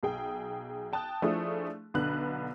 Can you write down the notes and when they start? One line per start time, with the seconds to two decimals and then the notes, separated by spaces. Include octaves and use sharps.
0.03 B1 G#4 G5
0.93 G5 A5 D#6 F#6
1.22 F3 A3 D4 E4 G#4 D#6
1.94 B1 D3 B3 F#6